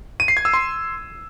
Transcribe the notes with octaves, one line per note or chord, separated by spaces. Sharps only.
D#7
C7
G#6
E6
C6